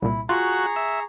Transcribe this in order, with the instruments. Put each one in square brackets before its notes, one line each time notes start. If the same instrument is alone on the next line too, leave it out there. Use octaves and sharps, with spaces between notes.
[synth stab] C2 A#2 [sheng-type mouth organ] E4
[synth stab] F4 [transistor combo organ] F#4 [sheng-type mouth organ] G#4 A#5 C#6
[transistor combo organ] E5